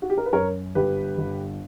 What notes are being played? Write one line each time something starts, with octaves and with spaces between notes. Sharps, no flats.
F#4
G4
A#4
B4
F#2 A#4 C#5
G1 G4 B4
G1